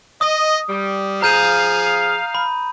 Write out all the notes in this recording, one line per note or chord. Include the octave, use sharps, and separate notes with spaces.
D#5 D#6
G3
F3 G#4 F5 A#5 G6 D#7
B5